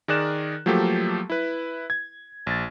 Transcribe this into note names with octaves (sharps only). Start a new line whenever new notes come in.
D#3 G#4 A#4 D5 F#6 E7
F3 F#3 A3 A#3 G4 A4
E4 B4
G#6
A#1 A6